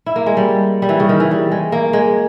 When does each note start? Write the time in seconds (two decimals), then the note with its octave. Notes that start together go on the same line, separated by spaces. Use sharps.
0.06 E4
0.16 A#3
0.26 G#3
0.37 G3
0.82 G3
0.89 E3
1.00 C#3
1.09 D#3
1.20 E3
1.31 G3
1.51 G#3
1.72 A#3
1.93 G#3